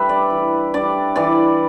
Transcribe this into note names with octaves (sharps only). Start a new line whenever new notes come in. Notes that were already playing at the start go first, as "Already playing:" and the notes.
Already playing: G3 D4 B4 E5
D5
E3
G3 D4 D5
E3 D5